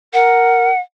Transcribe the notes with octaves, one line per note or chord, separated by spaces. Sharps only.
A#4 F#5